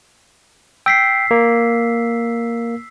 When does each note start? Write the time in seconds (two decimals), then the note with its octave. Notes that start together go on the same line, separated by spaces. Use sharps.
0.86 G5 E6 B6 C7
1.31 A#3